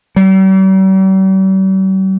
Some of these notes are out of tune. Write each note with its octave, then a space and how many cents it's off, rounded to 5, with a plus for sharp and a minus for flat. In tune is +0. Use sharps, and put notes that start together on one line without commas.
G3 -45